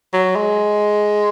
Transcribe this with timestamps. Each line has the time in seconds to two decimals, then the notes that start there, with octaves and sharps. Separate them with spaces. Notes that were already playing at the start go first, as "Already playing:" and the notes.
0.13 F#3
0.36 G#3